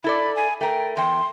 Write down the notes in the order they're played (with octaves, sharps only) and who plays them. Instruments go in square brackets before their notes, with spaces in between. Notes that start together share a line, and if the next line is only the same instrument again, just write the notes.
[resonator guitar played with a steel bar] E4 A4 D5 [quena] B5
[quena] G#5
[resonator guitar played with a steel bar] A3 A#4 [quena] G5
[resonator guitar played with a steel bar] E2 G5 [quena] C6